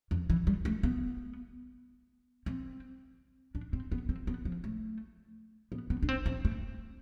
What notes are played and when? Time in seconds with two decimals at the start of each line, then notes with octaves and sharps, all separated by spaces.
0.11 F2
0.30 E3
0.47 G3
0.65 A3
0.83 B3
2.46 C4
3.55 D4
3.73 C4
3.92 B3
4.09 C4
4.27 B3
4.45 F3
4.64 A3
5.72 B3
5.90 B3
6.03 D4
6.09 C4
6.26 C4
6.45 A3